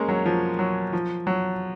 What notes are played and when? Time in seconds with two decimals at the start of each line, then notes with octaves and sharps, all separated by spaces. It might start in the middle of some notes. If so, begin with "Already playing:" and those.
Already playing: G#3 A#3 C#4
0.08 F#3
0.26 F3
0.59 F#3
0.93 F3
1.27 F#3